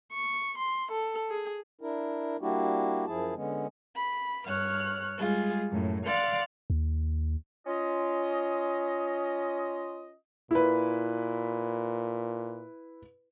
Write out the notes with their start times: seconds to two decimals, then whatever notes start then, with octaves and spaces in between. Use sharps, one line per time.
0.13 C#6
0.57 C6
0.91 A4
1.30 G#4
1.81 D4 E4 A#4
2.41 G3 A#3 D4 E4 F#4 G4
3.06 F#2 F3 E4 G#4 A5
3.35 D3 G#3 B3 C#4
3.96 B5
4.47 G2 C#5 F6 F#6
5.18 G3 G#3 F4 G#4
5.70 F#2 A2
6.06 D5 F5 F#5 C6
6.70 D#2
7.67 C#4 F4 D#5
10.51 A#2 E4 B4